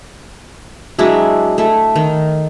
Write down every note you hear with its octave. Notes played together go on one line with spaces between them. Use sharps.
F#3 G#3 D4 E4
A3 E4
D#3